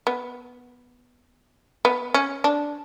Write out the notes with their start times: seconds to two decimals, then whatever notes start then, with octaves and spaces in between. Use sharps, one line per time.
0.07 B3
1.85 B3
2.14 C#4
2.44 D4